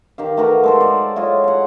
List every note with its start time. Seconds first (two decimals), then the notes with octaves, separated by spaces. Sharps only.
0.18 D#3 G4 F5
0.37 A3 F#4 A#4 B4
0.64 G#3 A4 C5
0.80 D5
1.16 E4 F4 C#5 D#5
1.44 F5 F#5